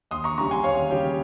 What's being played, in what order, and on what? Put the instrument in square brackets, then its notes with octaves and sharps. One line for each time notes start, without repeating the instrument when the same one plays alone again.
[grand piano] D#2 C6 D#6
A#5 C#6
C#3 G3 A#5 C#6
G#5 C6
D#2 C#5 F5
C#3 G3 G4